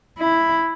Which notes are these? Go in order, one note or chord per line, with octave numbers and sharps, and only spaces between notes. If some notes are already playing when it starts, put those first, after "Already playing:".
E4